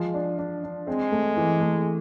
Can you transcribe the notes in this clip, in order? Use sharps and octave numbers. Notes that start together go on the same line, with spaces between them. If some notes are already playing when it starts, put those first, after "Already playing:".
Already playing: F3 G#3
D4
D4
D4
G#3 C4
A3
E3
A3